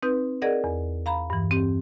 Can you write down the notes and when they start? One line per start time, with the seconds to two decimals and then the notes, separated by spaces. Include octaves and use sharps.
0.03 C4 D#4 B4 G6
0.42 G#4 A#4 D5 D#5 F#5
0.64 E2
1.06 F5 A#5 B5
1.30 G2 E3
1.51 C4 G4